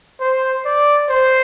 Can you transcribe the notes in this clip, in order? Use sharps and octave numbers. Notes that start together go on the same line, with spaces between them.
C5
D5
C5